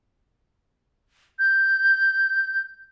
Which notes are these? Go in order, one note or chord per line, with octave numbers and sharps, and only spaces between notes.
G6